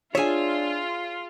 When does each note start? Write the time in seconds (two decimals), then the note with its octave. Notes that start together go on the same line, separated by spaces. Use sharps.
0.15 D4 F4 G#4 C#5 E5 G#5